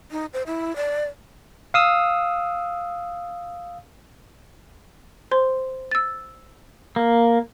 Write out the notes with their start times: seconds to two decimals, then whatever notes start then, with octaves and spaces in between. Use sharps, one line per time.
0.12 D#4
0.33 C5
0.47 E4
0.76 D5
1.74 F5 D#6 E6
5.31 C5 C6
5.91 E6 A6
6.96 A#3